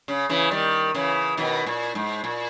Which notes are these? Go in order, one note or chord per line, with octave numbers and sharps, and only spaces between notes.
C#3
C#3 E3
D#3 G3
C#3 E3
B2 D#3
A#2
G#2
A#2